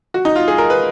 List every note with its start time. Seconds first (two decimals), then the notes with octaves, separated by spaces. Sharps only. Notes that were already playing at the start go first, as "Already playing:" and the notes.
0.14 F#4
0.25 D#4
0.36 F4
0.48 G#4
0.58 A#4
0.70 B4